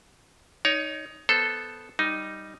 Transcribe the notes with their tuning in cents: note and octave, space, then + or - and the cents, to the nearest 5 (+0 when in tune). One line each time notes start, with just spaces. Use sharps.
D#4 +0 C#5 +25
B3 +0 A4 +0 C5 +0
G3 +0 D#4 +0